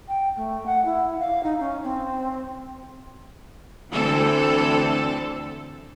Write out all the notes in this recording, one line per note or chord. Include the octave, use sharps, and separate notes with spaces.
G5
A3
F#5
E4
F5
D#4
C#4
C4
D2 E3 C4 A4